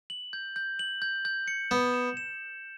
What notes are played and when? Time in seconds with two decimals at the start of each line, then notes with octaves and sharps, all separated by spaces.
0.10 F#7
0.33 G6
0.56 G6
0.79 F#7
1.02 G6
1.25 G6
1.48 C#7
1.71 B3 E7
1.94 E7
2.17 E7